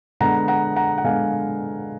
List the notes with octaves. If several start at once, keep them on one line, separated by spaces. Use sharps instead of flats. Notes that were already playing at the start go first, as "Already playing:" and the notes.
D3 G#3 B3 F#5 A#5
F#5 A#5
F#5 A#5
F#5
D3 G#3 B3 F5 G#5